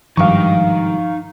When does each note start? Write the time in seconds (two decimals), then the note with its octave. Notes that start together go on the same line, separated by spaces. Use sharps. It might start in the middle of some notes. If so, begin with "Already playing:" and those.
0.17 G#1 G2 F3 D#4 F5 G5 C#6